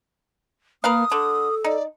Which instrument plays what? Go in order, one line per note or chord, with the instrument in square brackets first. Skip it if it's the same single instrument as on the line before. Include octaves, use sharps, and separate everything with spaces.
[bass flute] A#3 [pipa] A#4 B4 F5 [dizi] D#6
[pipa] D3 [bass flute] A4
[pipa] D#4 [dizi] D5